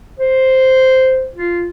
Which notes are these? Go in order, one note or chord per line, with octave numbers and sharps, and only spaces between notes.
C5
F4